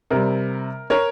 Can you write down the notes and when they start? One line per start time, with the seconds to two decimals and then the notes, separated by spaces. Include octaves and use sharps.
0.11 C3 G3 A#4
0.90 A#4 C#5